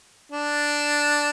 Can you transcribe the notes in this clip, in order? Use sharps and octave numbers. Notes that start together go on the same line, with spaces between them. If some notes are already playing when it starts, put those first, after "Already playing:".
D4